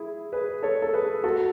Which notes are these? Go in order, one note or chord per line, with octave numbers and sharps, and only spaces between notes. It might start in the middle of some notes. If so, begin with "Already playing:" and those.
Already playing: E4 G#4
G#4 B4
A4 C#5
A4
G#4 B4
F#4 A4